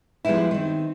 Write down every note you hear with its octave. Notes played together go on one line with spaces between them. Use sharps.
F3 G3 G#3 B3 C4 E4
D#3 C4